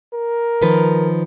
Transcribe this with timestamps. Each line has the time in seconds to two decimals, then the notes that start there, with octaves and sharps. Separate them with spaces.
0.14 A#4
0.61 D#3 F3 B4